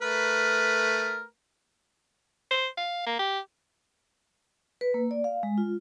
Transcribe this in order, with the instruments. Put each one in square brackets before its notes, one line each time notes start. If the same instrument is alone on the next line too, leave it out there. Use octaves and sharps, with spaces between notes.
[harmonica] A3 A#4 B4
[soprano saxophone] C5
F5
A#3
G4
[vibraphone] B4
A#3
D5
F5
G#3
F4